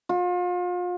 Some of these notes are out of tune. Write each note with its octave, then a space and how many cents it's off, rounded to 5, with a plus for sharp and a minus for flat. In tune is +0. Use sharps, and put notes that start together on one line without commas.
F4 +35